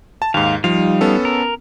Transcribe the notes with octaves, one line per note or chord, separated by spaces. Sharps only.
A5
D#2 G#2 F5
F3 G3 D#4 F5
B3 C#4 A4
A#4